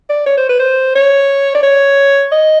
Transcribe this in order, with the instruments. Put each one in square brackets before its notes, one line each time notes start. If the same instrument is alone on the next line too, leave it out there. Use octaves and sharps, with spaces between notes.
[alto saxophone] D5
C#5
C5
B4
C5
C#5
D5
C#5
D#5